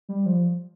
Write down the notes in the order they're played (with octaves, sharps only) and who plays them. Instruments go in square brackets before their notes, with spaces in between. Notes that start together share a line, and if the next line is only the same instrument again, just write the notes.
[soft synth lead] G3
F3